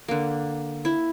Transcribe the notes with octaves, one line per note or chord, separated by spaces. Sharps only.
D3 A#3
E4